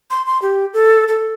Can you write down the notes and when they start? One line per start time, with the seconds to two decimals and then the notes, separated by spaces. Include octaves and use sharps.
0.10 C6
0.26 C6
0.42 G4
0.74 A4
1.08 A4